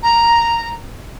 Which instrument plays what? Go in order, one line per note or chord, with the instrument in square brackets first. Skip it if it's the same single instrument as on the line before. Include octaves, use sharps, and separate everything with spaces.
[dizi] A#5